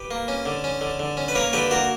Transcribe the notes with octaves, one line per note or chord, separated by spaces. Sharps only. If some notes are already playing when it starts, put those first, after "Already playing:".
Already playing: G4 B4
A#3
C#4
D3
C#4
D3
D3
C#4
B4
A#3 A#4 C#5
D3 G4 B4
A#3 F#4 A#4